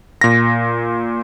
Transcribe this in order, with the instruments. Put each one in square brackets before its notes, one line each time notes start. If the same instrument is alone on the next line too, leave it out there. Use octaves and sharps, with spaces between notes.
[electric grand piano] A#2 A#6